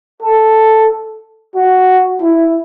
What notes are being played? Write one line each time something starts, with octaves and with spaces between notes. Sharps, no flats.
A4
F#4
E4